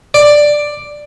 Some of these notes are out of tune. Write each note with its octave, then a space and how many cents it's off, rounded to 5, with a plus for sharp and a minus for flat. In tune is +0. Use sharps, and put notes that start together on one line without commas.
D5 +5